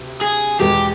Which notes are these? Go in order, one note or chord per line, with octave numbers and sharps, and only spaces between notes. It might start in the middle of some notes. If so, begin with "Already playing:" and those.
Already playing: D2 C3
G#4
E2 B2 G#3 G4